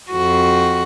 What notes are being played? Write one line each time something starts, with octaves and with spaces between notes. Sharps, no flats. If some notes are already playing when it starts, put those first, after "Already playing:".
F2 F#4